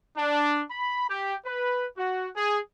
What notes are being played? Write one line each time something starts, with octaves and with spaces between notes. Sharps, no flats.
D4
B5
G4
B4
F#4
G#4